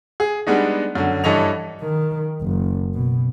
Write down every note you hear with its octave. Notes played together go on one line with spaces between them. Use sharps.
G#4
G3 G#3 B3 D4 D#4
F#2 D3
G2 E3 A4 C#5 D#5 F7
D#3
F#1
B2